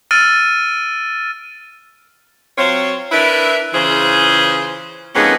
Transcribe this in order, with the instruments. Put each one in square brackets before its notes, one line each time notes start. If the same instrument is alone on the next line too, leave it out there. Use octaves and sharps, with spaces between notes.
[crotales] E6 F6 A6 D7 D#7
[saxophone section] F#3 C4 F4 C5 C#5
D4 E4 A#4 B4 E5
C#3 E3 F4 G#4 C5
F2 G#3 A#3 B3 C#4 D#4